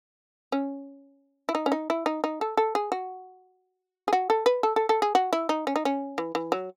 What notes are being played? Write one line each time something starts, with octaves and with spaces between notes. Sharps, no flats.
C#4
E4
D#4
C#4
D#4
E4
D#4
D#4
A4
A4
G#4
F#4
G#4
F#4
A4
B4
A4
A4
A4
G#4
F#4
E4
D#4
C#4
D#4
C#4
E3
E3
F#3